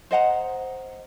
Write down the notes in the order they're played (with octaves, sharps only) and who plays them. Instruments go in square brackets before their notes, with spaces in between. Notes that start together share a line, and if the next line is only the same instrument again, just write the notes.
[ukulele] C5 D#5 F#5 A#5